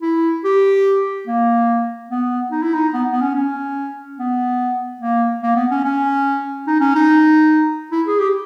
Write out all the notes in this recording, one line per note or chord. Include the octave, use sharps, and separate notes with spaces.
E4
G4
A#3
B3
D#4
E4
D#4
B3
B3
C#4
C#4
B3
A#3
A#3
B3
C#4
C#4
D#4
C#4
D#4
E4
G#4
G4